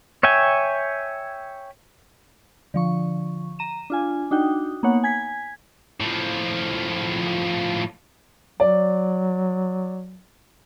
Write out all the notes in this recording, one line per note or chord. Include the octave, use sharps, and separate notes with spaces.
C#5 E5 G5 G#5
D3 F3 C#6
A#5 D#7 E7
D4 F4 G#5
D4 D#4 F#4 G5
A#3 B3 D#4 C#5 F#5
G#5 G#6 B6
A2 F3
F#3 D5